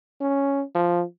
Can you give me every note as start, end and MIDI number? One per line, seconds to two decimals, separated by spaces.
0.21 0.62 61
0.75 1.03 53